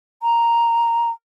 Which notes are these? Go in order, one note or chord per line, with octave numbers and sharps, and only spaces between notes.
A#5